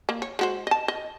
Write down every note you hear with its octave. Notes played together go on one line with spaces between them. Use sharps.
A#3
C#5
G#3 F#4 C5
D#5 A5
D#5